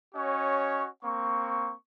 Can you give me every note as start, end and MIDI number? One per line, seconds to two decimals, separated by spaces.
0.15 0.88 61
0.15 0.88 66
0.15 0.88 73
0.15 0.88 75
1.03 1.73 58
1.03 1.73 60
1.03 1.73 85